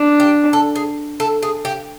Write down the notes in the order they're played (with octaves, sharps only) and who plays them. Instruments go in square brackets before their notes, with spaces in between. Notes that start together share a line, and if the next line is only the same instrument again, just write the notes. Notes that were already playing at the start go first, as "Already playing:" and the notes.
Already playing: [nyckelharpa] D4
[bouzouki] G4
A4
G#4
A4
G#4
G4